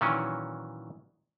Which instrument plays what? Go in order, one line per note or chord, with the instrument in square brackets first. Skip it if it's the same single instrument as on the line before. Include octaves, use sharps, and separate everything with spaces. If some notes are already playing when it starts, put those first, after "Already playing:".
[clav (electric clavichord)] A#2 D#3 E3 F#3 C#4